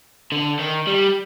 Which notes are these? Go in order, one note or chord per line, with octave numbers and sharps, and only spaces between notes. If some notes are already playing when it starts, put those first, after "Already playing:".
D3
D#3
G3